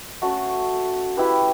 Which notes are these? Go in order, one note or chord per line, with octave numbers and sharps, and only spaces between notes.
A3 C#4 F#4 A4
E4 G4 B4